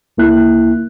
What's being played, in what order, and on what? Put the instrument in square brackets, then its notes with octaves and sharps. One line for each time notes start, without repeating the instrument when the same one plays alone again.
[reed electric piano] D2 A#3 E4 F#6